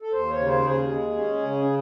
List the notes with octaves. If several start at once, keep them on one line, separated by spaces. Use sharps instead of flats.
A4
D#2 C5
C#5
C#3
C5
D#2 G#4
G#3
C#4
C#3